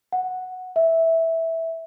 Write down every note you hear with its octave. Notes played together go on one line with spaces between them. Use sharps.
F#5
E5